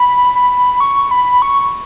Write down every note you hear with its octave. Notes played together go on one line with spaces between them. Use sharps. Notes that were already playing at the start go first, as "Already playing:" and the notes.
Already playing: B5
B5
C#6
B5
C#6